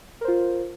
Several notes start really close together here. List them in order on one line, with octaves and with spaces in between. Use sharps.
A#4 C5 F4